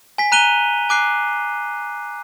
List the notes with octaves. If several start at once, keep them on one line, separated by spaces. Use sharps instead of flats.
G#5 B6
A#5 F#6 D#7 F7 G7
G#5 D6 F#6 C7